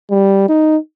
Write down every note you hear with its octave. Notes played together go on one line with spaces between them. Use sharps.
G3
D#4